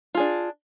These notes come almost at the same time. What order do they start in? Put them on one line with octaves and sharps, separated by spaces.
F4 G#4 D4